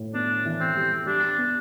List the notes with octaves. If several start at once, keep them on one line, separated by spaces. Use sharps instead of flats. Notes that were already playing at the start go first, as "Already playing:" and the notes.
Already playing: A2
B3 D4
E3
C4
G3
G3 D4
B3